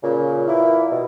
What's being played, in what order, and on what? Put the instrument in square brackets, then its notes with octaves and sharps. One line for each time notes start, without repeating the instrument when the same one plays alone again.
[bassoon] A#2 [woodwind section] C#3
[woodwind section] E3 A#3 E4
B2